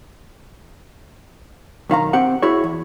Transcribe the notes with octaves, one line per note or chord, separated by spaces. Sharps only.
B1 D#3 F5 A#5
C4 G4 F#5
E4 F#4 G#4 C#5
E2